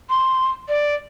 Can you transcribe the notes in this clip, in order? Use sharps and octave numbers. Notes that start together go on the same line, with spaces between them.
C6
D5